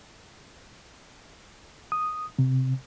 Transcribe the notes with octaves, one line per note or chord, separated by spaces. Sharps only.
D#6
C3